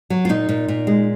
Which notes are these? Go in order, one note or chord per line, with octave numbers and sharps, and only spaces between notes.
F#3
F4
A#2 D#4
A#2
A#2
G#3